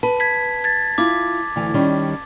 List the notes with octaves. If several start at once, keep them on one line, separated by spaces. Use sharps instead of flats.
B4 A5
G#6 B6
G#6 A6
E4 F4 D6
D2 E3
D#3 G3 C#4